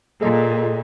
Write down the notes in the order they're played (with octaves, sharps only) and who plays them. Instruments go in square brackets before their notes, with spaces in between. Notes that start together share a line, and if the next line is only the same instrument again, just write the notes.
[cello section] A#2 [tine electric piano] G#4 A4 D#5